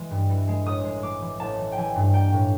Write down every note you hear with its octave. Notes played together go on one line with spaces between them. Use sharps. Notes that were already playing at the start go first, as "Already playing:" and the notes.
Already playing: E3 G#3
G2
E3
G#3
A1 D#6
G#3
G#3 D6
E3
A1 A5
E3
G5
E3 G#5
G2
A#3 G5
A2